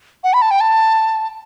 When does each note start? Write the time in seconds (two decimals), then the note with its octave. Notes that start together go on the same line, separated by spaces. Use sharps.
0.24 F#5
0.33 B5
0.42 A5
0.51 G5
0.60 A5